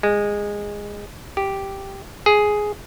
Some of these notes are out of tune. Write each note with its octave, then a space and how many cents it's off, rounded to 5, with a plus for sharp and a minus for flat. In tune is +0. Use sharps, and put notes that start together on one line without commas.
G#3 -15
G4 -5
G#4 +5